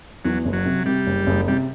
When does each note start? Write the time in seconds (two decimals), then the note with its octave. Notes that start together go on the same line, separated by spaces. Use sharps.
0.25 E2 F#3
0.45 F#1
0.53 F#3
0.66 C3
0.86 C3 G3
1.07 F#1
1.27 F#1
1.48 C3 G3